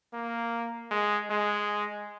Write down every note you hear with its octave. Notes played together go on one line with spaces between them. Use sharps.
A#3
G#3
G#3